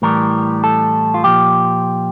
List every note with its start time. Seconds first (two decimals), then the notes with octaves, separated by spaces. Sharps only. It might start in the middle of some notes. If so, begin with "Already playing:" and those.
0.02 A2 E3 G3 A#4
0.64 A4
1.14 F4
1.24 A#2 F3 G4